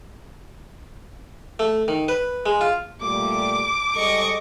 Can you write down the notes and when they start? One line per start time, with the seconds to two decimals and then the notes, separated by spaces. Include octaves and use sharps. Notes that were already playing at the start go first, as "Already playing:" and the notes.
1.59 A3
1.88 D#3
2.08 B4
2.46 G#3
2.61 F4
3.01 A#2 G3 A3 D6
3.95 G3 G#3 A4 D#5 C#6